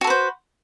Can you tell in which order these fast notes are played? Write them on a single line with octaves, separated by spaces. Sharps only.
F#4 A4 B4 C5